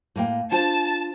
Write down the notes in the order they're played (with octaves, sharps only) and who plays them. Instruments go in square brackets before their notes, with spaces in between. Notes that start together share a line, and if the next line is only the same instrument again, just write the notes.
[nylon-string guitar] A2 A#3 G5
[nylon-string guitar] D4 F4 C5 [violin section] A5